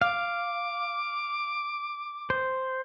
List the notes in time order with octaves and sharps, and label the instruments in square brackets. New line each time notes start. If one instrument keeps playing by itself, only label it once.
[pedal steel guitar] F5 [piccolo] D6
[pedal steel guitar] C5